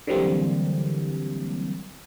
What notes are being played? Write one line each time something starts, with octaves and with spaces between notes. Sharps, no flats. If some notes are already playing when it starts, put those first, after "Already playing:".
D3 E3 F#3 G3 A#3 C4